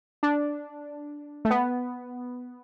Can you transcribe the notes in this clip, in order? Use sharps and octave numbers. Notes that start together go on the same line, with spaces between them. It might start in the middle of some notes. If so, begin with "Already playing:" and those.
D4
A3
B3